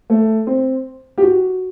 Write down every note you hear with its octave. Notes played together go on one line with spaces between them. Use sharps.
A3
C4
G4
F#4